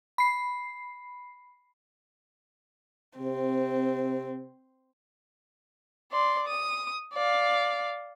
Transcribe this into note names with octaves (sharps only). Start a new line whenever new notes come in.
B5 C7
C3 C4
D5 C6
D#6
D5 F5